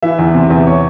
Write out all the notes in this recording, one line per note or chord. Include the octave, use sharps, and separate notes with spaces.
E3 E5
E2
C3
E2
C#5